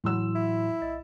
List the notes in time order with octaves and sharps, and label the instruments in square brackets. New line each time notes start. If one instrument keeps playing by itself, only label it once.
[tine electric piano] A2 C6 [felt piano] E3 F#3 E6
[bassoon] E4
[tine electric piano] B1 D#5 A6